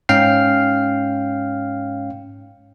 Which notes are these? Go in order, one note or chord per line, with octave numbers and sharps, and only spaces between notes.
G#2 C#4 F5 G5 F6 C7